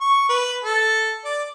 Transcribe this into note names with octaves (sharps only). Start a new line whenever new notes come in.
C#6
B4
A4
D5